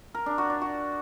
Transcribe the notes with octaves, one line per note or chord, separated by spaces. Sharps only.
A#4
D4
F#4
D5
F#4